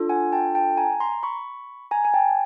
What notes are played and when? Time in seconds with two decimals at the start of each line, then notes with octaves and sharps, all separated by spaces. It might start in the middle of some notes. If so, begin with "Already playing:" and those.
Already playing: D4 F4 A4
0.09 F#5 G#5
0.32 G5 A5
0.55 G5 A5
0.77 G#5 A#5
1.00 A#5 C6
1.23 B5 C#6
1.91 G#5 A#5
2.05 G#5
2.14 G5 A5